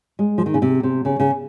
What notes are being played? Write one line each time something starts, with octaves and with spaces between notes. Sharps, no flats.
G#3
F3
D#3
C#3
C3
C3
C#3
C#3